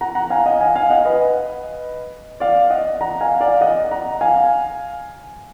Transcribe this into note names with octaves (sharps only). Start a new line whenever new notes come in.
F#5 A#5
F#5 A#5
F5 G#5
D#5 F#5
F5 G#5
F5 G#5
D#5 F#5
B4 D#5
D5 F5
D#5 F#5
F#5 A#5
F5 G#5
D5 F5
D#5 F#5
F#5 A#5
F5 G#5